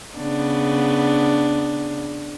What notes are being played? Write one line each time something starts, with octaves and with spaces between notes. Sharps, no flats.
C#3 B3 D4